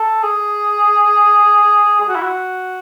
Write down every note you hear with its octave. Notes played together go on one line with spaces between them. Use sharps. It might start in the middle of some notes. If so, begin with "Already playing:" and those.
Already playing: A4
G#4
G#4
F#4
E4
F#4